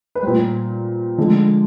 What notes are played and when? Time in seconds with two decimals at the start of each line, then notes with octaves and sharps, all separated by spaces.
0.15 B4
0.23 A#2 G3 C5
1.18 D3 F3 G#3